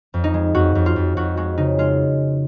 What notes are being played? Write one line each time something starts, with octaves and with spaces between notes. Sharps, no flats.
F2
D#4
G#3
F2 F#4
F2
F4
F2
F2 F#4
G#3 F#4
C#3 D#4
G#3 F4